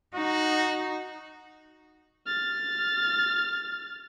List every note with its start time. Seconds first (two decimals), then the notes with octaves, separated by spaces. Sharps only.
0.15 D#4 F#4
2.26 F6 A6